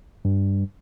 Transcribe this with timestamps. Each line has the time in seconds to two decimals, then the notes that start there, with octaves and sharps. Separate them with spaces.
0.25 G2